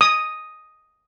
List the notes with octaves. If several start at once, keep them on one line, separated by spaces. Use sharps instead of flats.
D#6